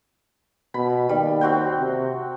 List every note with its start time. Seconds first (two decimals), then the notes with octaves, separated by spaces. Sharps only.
0.74 B2 B5
1.09 D#2 G3
1.41 C4 F#4 G5
1.79 C3